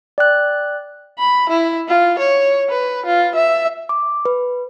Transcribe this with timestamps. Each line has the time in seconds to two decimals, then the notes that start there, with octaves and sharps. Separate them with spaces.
0.18 D5 G5 F#6
1.19 B5
1.50 E4
1.88 F4
2.19 C#5
2.69 B4
3.06 F4
3.36 E5
3.89 D6
4.25 B4